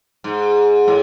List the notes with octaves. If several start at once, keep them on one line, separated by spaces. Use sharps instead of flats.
G#2
A2